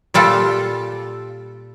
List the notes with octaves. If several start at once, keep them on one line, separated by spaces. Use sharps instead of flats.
A#2 G3 F4 A4